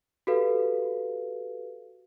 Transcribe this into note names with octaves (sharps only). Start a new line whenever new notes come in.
F#4 G4 A4 B4 F5